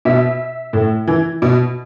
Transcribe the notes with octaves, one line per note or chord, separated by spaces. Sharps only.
B2 E5
A2
E3
B2